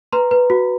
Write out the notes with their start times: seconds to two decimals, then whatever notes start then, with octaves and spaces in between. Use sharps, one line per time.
0.13 B4 A#5 C6
0.31 B4
0.50 F#4